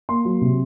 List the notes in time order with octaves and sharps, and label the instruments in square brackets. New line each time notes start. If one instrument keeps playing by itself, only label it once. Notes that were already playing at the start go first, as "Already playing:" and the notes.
[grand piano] A#3 C6
F#3
C3